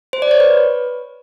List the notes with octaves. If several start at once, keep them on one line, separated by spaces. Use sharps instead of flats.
C5
D5
C#5
B4